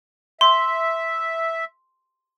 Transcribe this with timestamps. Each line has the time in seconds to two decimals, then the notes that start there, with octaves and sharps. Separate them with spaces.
0.41 E5 C6